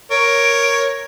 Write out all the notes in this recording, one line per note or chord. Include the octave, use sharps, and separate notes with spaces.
A#4 C#5 D7